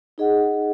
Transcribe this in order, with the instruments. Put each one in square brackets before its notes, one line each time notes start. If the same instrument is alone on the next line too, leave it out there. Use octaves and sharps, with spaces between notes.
[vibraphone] D#4 G#4 D#5 F#5